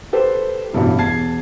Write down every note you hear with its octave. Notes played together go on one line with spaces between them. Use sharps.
G4 A4 B4 C5
A1 G2 B2 E4
E1 A5 G#6 C7